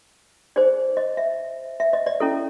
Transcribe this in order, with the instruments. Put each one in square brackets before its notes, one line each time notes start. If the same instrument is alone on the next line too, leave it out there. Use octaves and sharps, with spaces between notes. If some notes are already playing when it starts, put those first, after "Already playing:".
[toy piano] D#4 G#4 C5 D5
D#5
E5
E5
D#5
D5
C#4 E4 A4